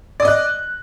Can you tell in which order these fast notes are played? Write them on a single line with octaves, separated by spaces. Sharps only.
D5 D#6 D#5 F#6